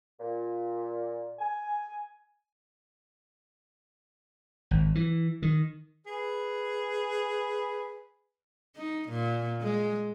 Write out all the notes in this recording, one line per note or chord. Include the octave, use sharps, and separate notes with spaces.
A#2
G#5
G#1
E3
D#3
G#4 B4
D#4
A#2
G#3